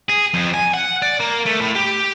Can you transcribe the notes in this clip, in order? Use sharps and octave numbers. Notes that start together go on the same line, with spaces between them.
G#4
F2
G#5
F#5
D5
A#3
A3
A2
G4